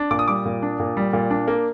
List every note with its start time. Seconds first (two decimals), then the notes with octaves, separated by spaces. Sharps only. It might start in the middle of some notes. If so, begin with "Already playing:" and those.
Already playing: D4
0.11 A#2 D6
0.19 D#6
0.28 G3 D6
0.45 A#2
0.62 D4
0.79 A#2
0.97 G3
1.13 A#2
1.30 D4
1.47 A#3